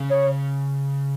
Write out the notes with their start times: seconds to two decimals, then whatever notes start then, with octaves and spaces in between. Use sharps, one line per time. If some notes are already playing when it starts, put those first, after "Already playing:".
Already playing: C#3
0.10 C#5